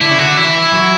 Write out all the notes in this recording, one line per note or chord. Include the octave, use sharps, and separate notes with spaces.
D3 E4
C#3
D3 F#4
E3 E4
F#3